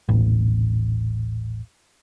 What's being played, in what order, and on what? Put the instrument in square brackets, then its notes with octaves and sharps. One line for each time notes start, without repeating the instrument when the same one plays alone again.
[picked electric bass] D#1 A1